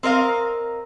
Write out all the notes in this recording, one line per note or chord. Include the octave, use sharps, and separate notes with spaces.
C4 A#4 D#5 F5